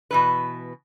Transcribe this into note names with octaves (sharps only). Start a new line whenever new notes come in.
B2 E3 B4